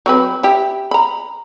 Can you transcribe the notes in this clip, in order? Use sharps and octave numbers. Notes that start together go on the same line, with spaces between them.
F#3 C4 B4
E4 G4
A#5 B5